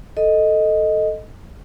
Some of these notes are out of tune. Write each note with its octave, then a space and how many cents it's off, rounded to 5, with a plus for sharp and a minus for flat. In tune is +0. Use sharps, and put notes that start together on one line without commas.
A4 +0 D#5 +0